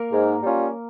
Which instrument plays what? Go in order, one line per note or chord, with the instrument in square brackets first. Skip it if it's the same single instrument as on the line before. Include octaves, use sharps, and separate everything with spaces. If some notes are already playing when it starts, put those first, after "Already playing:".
Already playing: [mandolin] A#3 A#4
[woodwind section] G#2
G3 C#4 F4